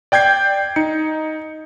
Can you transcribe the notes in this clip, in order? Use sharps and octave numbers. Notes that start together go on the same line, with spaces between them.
D5 G5 G6 G#6 C7
D#4 C#7